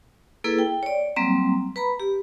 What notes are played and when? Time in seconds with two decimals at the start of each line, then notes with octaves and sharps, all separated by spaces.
0.44 A#3 E4 G#4 A4 B4
0.59 G5
0.83 C#5 D5
1.16 F#3 G3 A#3 C4 A#5
1.76 B4 A#5 B5
2.00 G4